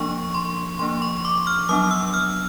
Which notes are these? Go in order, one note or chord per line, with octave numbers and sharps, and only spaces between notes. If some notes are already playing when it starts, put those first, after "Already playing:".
Already playing: F3 A#3 D4 C#6
C6
F3 A#3 D4 C6
C#6
D6
F6
F#3 B3 D4 D#6
E6
F6